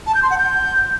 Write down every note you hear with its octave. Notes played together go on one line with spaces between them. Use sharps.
A5
G6
C6
F#5
G6